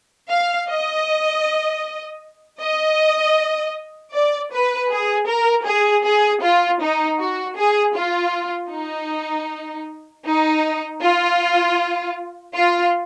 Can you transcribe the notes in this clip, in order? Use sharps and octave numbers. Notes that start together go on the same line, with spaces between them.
F5
D#5
D#5
D5
B4
G#4
A#4
G#4
G#4
F4
D#4
F#4
G#4
F4
D#4
D#4
F4
F4